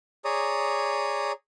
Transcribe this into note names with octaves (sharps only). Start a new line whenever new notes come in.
G#4 C#5 D5 A#5 D#6